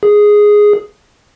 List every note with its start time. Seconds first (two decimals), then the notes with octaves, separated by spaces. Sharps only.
0.03 G#4